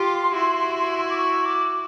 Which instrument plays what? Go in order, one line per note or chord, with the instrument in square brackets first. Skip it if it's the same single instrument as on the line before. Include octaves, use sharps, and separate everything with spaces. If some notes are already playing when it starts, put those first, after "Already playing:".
Already playing: [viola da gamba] F4 G4 [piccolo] C6
[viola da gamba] E4 F#4
[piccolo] D6
C#6
D6